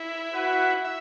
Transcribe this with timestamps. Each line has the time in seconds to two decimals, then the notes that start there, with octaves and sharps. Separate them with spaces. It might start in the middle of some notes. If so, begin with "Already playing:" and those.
Already playing: E4
0.33 F#4 B4 F#5
0.85 E5